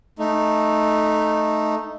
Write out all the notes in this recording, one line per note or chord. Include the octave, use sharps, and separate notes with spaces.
A3 D#4